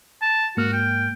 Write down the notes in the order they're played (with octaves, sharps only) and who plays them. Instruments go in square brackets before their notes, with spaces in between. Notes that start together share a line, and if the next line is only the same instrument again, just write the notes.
[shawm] A5
[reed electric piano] G#2 A#3 F6 [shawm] F#4
[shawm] G5